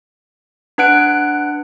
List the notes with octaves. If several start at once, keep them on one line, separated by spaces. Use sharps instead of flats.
D4 B4 F#5 F#6 D7